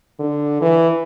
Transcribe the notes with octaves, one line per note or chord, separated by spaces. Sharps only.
D3
E3